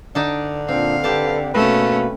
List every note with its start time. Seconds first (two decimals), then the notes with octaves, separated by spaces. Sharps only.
0.15 D3 D4 D#4 A5
0.69 A#2 C4 D4 F5
1.04 C4 G4 A4 B4 A5
1.54 B2 A3 A#3 C#4 B4